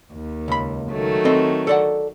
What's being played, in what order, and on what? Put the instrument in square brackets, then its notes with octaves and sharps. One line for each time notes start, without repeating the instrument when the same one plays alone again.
[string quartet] D#2
[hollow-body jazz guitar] C#2 B5
[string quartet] D#3 F#3 A3
[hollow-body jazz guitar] C4 A4 D#5
A4 D5 F#5